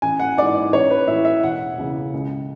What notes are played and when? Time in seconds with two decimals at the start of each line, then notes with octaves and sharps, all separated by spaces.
0.02 A1 G#5
0.20 F#5
0.37 G#2 E3 D5
0.55 D5
0.73 A1 C#5
0.90 B4
1.07 A2 E3 E5
1.25 E5
1.43 E1 F#5
1.78 E2 C#3 E3
2.13 C#2